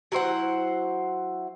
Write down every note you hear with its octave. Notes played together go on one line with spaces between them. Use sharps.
F#3 E4 C5 F#5